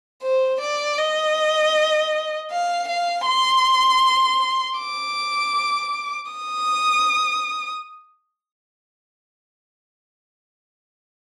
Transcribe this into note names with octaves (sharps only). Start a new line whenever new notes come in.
C5
D5
D#5
F5
F5
C6
D6
D#6